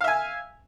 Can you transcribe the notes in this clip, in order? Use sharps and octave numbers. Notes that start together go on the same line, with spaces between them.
E5 F5 G#5